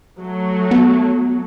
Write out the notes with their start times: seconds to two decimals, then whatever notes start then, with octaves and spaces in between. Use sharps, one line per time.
0.20 F#3 A3
0.71 B3